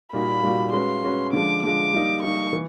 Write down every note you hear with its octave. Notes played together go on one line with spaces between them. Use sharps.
A#2 G3 A#3 D#4 F#4 B5
A#2 G3 A#3 D#4 F#4
G#3 C#4 F#4 B4 C6
G#3 C#4 F#4 B4
D3 F3 G#3 D6
D3 F3 G#3 D6
G3 A#3 D#4
G3 A#3 D#4 C#6
E3